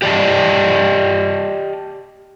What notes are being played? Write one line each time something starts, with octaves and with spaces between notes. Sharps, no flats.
G4 D5 D#5 A5